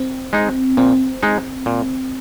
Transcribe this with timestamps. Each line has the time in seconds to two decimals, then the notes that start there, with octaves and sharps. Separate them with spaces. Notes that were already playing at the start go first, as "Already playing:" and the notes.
Already playing: C4
0.33 G#3 D#4
0.77 A#2 C4
1.23 G#3 D#4
1.66 A#2